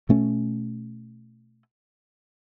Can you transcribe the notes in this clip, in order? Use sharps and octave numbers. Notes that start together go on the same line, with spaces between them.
B2 A3 C#4